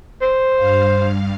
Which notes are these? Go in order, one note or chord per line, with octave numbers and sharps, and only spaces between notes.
C5
G2 F5